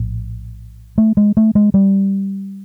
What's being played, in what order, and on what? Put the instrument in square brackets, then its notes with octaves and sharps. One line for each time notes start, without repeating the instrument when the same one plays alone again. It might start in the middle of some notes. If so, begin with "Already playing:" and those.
Already playing: [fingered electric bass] A#1 A2
A3
G#3
A3
G#3
G3